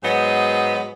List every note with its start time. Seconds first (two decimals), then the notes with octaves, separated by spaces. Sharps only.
0.03 G#2 F#3 B3 C5 D#5